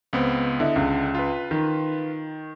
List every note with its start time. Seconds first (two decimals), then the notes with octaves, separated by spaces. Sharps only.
0.13 C#2 B3 C4
0.60 D3 E4 D#5
0.76 C#2
1.15 F4 B4
1.51 D#3